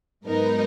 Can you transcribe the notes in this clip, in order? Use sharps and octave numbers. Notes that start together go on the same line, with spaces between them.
G#2 F#3 B3 D#4 A#4